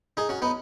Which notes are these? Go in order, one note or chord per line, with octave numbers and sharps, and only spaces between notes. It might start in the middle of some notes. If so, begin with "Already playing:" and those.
D#4 G#4
C#4 F#4
B3 D#4